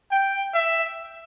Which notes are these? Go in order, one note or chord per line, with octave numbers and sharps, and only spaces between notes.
G5
E5